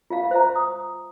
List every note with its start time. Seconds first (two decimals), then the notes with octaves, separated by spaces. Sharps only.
0.10 F4 E5 F5
0.31 C5 E5 A#5
0.56 D#6